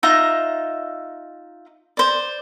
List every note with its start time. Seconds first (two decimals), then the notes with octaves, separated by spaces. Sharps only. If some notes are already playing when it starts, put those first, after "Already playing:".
0.03 D#4 F4 E5 A#5
1.97 C5 D5